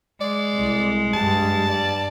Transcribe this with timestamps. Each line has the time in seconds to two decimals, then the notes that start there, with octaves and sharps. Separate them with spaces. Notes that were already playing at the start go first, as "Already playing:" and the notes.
0.21 G#3 D5
0.54 C2
1.14 G2 G3 A5
1.70 D5